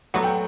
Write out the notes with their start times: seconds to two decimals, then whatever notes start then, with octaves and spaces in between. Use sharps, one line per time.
0.14 F#3 B3 F#4 A4 F#5
0.24 G5